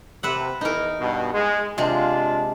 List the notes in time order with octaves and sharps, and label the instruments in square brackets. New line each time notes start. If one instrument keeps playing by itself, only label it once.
[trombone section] C3 [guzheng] B4 E5 F#5
[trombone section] E2 E3 [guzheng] D#4 A#4
[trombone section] G2 B2
G#3
[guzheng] C3 G#3 [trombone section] D4 F4